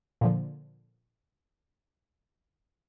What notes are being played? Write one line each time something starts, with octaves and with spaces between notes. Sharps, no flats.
A#2 D3 F3